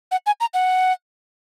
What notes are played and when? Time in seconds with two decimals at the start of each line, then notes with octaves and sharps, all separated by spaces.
0.11 F#5
0.26 G#5
0.40 A#5
0.54 F#5